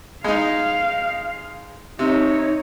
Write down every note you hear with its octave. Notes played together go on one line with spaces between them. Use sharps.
G#3 D#4 F5
C3 D#4 C#5